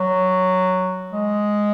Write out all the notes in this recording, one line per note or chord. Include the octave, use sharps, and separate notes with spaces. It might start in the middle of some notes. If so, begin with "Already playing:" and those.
Already playing: F#3
G#3